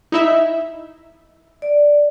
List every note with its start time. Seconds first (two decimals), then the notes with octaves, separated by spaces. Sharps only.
0.12 D#4 E4 E5
1.62 D5